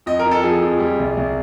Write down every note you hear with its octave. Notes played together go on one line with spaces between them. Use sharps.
F2 D#5
A#4
F2
A4
F3 G#4
F2
G3
C2
C2